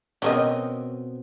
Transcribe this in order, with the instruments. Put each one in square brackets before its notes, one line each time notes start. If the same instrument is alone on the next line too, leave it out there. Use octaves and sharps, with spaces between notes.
[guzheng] B2 C4 [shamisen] C#4 A#4 D#5